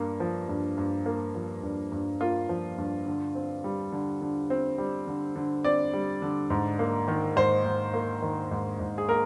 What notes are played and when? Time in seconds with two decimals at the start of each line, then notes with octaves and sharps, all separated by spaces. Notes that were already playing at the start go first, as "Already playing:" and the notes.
Already playing: G2 A#3
0.20 F3
0.49 G2
0.77 G2
1.06 A#3
1.35 F3
1.63 G2
1.92 G2
2.20 A#3 F4
2.49 F3
2.78 G2
3.07 D3
3.35 C4
3.64 G3
3.92 D3
4.21 D3
4.50 C4
4.78 G3
5.07 D3
5.36 D3
5.64 C4 D5
5.93 G3
6.22 D3
6.50 G#2
6.79 A#3
7.08 D#3
7.36 G#2 C5
7.65 G#2
7.94 A#3
8.22 D#3
8.51 G#2
8.80 G#2
8.98 G#4
9.08 A#3 A#4